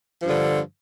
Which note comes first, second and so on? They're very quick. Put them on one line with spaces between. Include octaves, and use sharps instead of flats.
F3 G2 D3